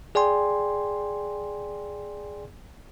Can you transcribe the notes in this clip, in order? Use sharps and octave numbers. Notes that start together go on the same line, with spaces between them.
G#4 D5 G5 G#5 C6